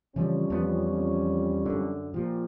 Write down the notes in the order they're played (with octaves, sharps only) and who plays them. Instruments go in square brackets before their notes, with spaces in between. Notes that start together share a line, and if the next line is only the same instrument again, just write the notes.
[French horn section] F2 G3 C#4 [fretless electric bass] C#3 E3 F3
[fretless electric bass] E2 F3 B3
F#2 D3
[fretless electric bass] A#2 F3 [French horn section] G4